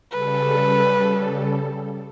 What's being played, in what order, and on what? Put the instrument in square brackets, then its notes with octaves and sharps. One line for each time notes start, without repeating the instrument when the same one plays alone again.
[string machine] C#3 G3 A4 [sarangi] B4